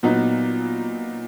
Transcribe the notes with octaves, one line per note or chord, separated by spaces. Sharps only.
A#2 F#3 B3 D#4